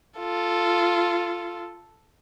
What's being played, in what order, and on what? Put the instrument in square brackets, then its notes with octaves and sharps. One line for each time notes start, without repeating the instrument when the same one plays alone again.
[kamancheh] F4 A4